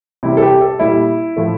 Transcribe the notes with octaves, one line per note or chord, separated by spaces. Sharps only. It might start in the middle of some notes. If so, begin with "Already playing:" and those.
C3 E3 G3 E4
A4
G4
A4
A#2 G3 E4
A2 F3 A3